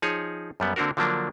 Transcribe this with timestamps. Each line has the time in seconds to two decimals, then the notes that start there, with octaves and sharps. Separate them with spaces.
0.02 F3 D#4 G#4 C#5
0.60 F#2 G3 B3
0.76 D3 A#3 C4 D4 F#4 A#4
0.97 D3 F3 F#3 A#3 D4